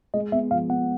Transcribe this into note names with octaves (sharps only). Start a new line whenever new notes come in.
G#3 D#5
B3 E5
F3 F5
B3 F#5